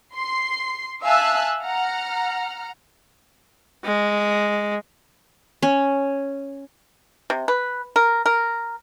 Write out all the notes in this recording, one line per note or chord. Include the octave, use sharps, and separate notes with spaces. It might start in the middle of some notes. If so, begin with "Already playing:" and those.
C6 C7
E5 F5 G#5 A5 E6 F#6
F#5 A#5 F6
G#3
C#4
C3
B4
A#4
A#4